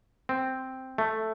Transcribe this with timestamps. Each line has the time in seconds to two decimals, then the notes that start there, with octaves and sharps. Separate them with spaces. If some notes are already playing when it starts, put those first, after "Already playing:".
0.29 C4
0.98 A3